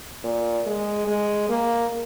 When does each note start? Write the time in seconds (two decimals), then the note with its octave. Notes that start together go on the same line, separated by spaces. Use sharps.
0.24 A#2
0.66 G#3
1.07 G#3
1.49 A#3